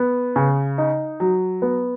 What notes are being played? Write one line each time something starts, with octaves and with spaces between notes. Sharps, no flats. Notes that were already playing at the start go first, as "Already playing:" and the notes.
Already playing: B3
C#3
D#4
F#3
B3